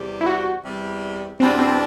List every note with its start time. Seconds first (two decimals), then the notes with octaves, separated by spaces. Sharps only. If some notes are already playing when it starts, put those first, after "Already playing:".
Already playing: E2 C3 G3
0.21 E4
0.26 F#4
0.64 E2 C3 G3
1.40 E2 B2 G3 C4 D4 G4
1.59 C4